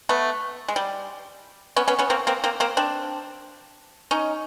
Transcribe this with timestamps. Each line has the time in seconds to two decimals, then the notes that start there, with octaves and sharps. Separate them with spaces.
0.09 A3 B3
0.68 G#3
0.76 G3
1.76 B3 C#4
1.88 B3 C#4
1.99 B3 C#4
2.10 A#3 C4
2.27 A#3 C4
2.44 A#3 C4
2.60 A#3 C4
2.77 C4 D4
4.11 C#4 D#4